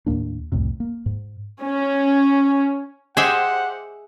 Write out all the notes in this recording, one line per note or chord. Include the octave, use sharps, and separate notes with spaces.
D#2 A2 A#3 D4
C2 F2 A2 C3
A#3
G#2
C#4
G4 G#4 C5 D#5 E5 F#5